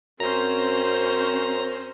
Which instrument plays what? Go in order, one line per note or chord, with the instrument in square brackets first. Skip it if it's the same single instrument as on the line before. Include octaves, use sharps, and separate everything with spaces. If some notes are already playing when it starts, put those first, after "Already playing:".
[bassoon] F#2 [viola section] C4 C#4 C5 [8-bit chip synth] A#5